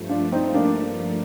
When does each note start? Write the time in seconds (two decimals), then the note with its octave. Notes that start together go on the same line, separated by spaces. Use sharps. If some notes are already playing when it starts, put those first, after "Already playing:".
Already playing: G2 F3 A3
0.09 D4 F4
0.32 C4 D#4
0.54 A#3 D4